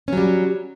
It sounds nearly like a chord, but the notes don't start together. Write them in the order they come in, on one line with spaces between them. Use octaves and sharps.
C#4 F#3 G3